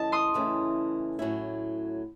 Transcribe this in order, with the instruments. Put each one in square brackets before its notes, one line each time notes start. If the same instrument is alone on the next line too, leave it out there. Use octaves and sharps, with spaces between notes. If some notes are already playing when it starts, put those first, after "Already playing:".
Already playing: [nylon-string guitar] E2 C#3 E3 A3 C#4 [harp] D#5 A5
[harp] C6 D#6
[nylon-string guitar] E2 C#3 E3 A3 C#4
A2 F#3 C#4 E4